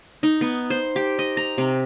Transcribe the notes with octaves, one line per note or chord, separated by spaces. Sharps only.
D#4
B3
C5
G4
D#5
A#5
C3